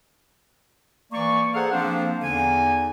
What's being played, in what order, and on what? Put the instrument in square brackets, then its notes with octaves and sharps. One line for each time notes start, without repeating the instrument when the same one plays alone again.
[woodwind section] E3 A#3 D5 C#6
G#4 A4 C5 F5 F#5 A#5
F3 A#3 C4 D4 C5 F5
E2 D3 D#4 G#5